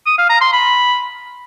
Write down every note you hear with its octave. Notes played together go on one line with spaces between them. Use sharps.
D#6
F5
A#5
C6
B5